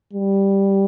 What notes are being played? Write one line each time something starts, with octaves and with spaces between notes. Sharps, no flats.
G3